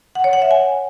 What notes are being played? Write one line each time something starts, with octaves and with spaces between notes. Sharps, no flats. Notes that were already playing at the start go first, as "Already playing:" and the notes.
F#5
C#5
F#5
E5
G#5